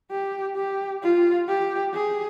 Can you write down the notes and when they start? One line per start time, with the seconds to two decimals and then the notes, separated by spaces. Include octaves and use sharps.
0.11 G4
0.56 G4
1.03 F4
1.48 G4
1.94 G#4